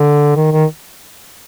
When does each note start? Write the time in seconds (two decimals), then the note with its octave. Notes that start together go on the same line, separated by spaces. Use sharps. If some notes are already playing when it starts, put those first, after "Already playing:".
Already playing: D3
0.36 D#3
0.51 D#3